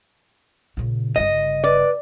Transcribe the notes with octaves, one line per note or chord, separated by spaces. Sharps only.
A#2 C#3
G1 C#3 D#5
B4 D5